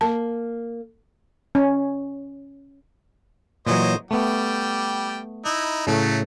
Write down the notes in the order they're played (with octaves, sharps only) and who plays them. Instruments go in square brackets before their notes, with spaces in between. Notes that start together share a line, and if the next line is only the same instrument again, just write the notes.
[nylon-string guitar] A#3 [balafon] A5
[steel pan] C#4
[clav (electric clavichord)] A#2 E3 F#3 [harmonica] C5 C#5 D#5
[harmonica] G3 G5 [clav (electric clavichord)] A3 B3
[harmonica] D#4 E4
[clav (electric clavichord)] A2 C#3 [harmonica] F#3 A3